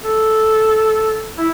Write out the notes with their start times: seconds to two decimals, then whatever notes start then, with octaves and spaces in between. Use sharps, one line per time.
0.04 A4
1.38 E4